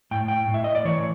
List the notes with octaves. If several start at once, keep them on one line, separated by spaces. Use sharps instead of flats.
A2 G5
G5
A2
E5
D#5
D5
E3 C#5